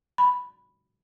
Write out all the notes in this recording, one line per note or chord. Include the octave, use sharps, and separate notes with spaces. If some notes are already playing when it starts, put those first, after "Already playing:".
B5